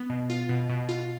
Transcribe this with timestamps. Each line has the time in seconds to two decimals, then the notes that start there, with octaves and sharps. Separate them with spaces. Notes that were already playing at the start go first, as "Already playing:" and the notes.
Already playing: B3
0.10 B2
0.30 F4
0.49 B2
0.69 B2
0.89 F4